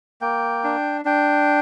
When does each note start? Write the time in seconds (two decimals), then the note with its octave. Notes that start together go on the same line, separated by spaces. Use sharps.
0.21 A#3 G5
0.64 D4
1.05 D4 G5